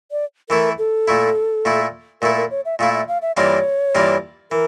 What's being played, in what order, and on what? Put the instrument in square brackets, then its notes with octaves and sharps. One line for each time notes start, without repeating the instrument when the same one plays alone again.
[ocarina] D5
[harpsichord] E3 A3 E4 [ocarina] A#4
[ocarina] A4
[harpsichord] A#2 A3 E4
A#2 A3 E4
[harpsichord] A#2 A3 E4 [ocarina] A#4
[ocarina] A#4
C#5
E5
[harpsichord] A#2 A3 E4 [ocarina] F5
[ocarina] E5
F5
E5
[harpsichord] G2 E3 A#3 D4 F4 [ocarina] C#5
[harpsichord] G2 E3 A#3 D4 F4
[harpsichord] E3 [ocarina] A#4